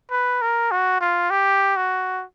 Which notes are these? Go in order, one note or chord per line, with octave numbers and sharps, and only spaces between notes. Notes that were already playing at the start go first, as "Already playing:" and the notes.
B4
A#4
F#4
F4
G4
F#4